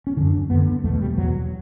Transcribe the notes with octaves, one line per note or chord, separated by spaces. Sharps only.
C#4
F#2 D3 D4
F#2 D3 B3
B3
E2 B2 A3
G3
E2 B2 F#3